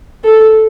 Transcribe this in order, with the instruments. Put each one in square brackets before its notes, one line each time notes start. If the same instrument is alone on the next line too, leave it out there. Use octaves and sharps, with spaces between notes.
[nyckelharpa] A4